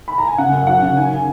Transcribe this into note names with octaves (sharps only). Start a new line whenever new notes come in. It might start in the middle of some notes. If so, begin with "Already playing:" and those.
B5
A#5
G#5
C#3 F#5
F#2
F#3 F#5
C#3
D#3 G#5
D#3